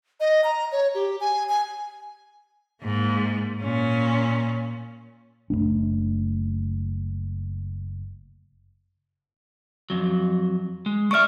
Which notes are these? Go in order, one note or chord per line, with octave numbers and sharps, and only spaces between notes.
D#5
A#5
C#5
G4
G#5
G#5
G#2 A#3
A#2 C#4
F#1 F#2 A3 D4
F2 F#3
G#3
G#3 D5 E5 C#6 F6